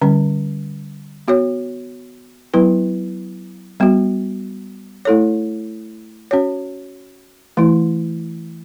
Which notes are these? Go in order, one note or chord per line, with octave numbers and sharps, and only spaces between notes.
D3 G3 C#4
B3 F#4 C#5
F#3 B3 E4 B4
G3 B3 F#4
A3 E4 A4 C#5
C#4 F#4 C#5
E3 A3 E4